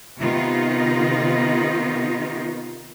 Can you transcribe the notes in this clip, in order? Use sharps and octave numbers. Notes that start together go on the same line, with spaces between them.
C3 D#3 B3 D#4 F4